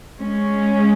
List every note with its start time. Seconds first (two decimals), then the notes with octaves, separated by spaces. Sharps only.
0.20 G#3 C#4